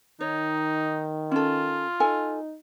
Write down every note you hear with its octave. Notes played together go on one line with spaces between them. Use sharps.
D#3 D#4 C#5
C#4 F4 A4
D#4 A4 G#5